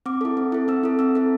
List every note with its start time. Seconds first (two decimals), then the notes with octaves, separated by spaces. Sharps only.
0.06 C4 D6
0.21 E4 A4
0.37 C4
0.52 E4 A4
0.68 C4 E6
0.84 E4 A4
0.99 C4 E6
1.15 E4 A4